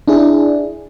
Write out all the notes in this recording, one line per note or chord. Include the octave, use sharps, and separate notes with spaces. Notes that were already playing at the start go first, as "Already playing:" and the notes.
D4 E4 G#4